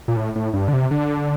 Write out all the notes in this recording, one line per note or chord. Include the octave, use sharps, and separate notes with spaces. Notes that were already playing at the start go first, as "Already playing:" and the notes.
A#2
A2
A2
G2
D3
C3
D3